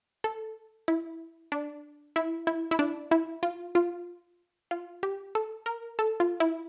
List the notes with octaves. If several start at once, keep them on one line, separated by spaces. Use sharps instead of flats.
A4
E4
D4
E4
E4
E4
D4
E4
F4
F4
F4
G4
A4
A#4
A4
F4
E4